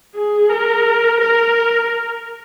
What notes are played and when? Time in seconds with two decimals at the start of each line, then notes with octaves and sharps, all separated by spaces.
0.15 G#4
0.49 A#4
1.21 A#4